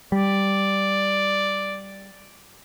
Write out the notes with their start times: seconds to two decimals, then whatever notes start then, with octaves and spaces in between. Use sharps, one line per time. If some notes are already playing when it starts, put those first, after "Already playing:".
0.12 G3 D5